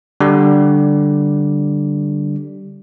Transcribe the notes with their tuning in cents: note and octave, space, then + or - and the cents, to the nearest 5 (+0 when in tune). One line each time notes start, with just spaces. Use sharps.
D3 +0 G3 -10